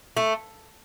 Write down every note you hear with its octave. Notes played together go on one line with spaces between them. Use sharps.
A3